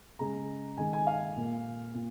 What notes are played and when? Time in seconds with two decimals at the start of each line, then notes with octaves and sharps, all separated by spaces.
0.19 C#3 G#3 A#5
0.77 D#3 G#3 G#5
0.93 G#5
1.07 F5
1.36 A#2 A#3
1.94 A#2